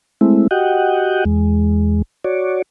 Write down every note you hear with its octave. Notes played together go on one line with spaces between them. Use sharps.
G#3 A3 C4 E4
F#4 G4 D#5 F#5 G5
E2 G#3
F#4 C#5 D5